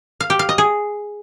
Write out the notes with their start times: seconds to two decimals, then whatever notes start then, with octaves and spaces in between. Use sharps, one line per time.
0.20 F5
0.30 G4
0.39 F5
0.49 D#5
0.58 G#4